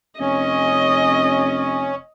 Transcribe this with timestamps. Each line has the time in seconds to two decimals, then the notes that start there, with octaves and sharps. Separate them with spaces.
0.20 F1 C#4 D#5